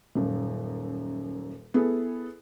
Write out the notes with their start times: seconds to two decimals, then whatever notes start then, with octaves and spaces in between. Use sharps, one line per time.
0.15 D#1 F#2
1.74 B3 E4 G#4 A4